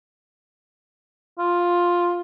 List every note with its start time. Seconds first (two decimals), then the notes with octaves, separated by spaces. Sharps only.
1.39 F4